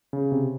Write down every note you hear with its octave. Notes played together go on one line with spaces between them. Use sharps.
C#3
C3